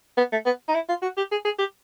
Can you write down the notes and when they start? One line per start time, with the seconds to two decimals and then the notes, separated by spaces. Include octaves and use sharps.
0.18 B3
0.32 A3
0.46 B3
0.69 D#4
0.75 E4
0.89 F4
1.02 F#4
1.17 G4
1.32 G#4
1.45 G#4
1.59 G4